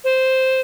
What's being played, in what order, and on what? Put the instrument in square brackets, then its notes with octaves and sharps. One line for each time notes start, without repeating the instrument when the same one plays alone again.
[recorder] C5